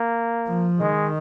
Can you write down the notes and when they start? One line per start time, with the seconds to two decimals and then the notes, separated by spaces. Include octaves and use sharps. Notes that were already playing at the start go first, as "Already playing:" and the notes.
Already playing: A#3
0.48 F3
0.79 D#3 G#3